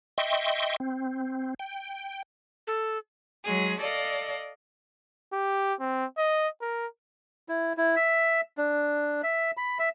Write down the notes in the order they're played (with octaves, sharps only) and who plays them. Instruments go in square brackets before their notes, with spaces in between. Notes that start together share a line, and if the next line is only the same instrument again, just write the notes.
[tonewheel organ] D#5 E5 G5 C6 C#6
C4
G5
[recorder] A4
[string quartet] F#3 G#3 G#4
A4 D5 D#5 F5
[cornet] G4
C4
D#5
A#4
[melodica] E4
E4
E5
D4
E5
B5
E5